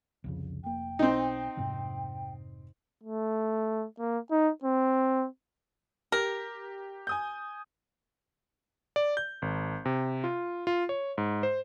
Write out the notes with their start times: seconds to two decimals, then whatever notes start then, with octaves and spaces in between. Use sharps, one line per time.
0.24 C2 F2 C#3
0.63 F1 A#3 G5
0.99 B1 C4 D#4
1.57 F1 G#2 C3
3.03 A3
3.99 A#3
4.31 D#4
4.64 C4
6.12 G4 A#4
7.07 G#5 D#6 G6
8.96 D5
9.17 G6
9.42 G#1
9.85 C3
10.24 F4
10.67 F4
10.89 C#5
11.18 G#2
11.43 C5